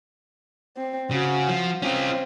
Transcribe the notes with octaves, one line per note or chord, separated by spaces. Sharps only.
C4
C#3 F#4
F3
C4 C#4 F4